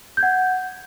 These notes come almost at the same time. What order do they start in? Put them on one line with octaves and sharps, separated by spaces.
G6 G#6 F#5